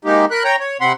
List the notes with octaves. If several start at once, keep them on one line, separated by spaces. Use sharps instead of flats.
G#3 A#3 D#4 G4
A#4 B5 F#6
C#5 G5 A#5
C#5
C3 C4 F#5 B5 C6